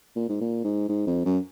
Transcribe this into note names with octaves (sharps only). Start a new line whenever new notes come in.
A#2
G#2
A#2
G#2
G#2
F2
F#2